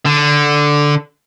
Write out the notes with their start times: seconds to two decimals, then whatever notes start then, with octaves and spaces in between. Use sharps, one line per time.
0.05 D3